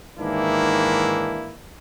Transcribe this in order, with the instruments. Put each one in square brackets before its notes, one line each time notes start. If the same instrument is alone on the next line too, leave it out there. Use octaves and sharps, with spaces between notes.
[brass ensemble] G#2 D#3 E3 A#3 D4 E4